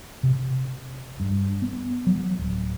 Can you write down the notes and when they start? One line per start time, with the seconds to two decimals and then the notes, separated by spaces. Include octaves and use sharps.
0.23 C3
1.20 G2
1.62 B3
2.07 F#3
2.39 D1